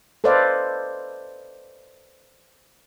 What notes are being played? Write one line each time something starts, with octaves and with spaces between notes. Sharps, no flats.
A4 B4 C5 D5 D#5 F5